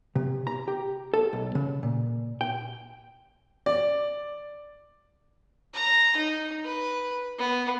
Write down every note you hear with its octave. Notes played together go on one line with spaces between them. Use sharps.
C3
A#5
G4
A4
B1
C#3
A#2
G5
D5
A#5
D#4
B4
B3